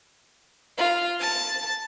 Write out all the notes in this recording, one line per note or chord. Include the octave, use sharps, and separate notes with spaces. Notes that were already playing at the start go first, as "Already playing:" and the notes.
F4
A5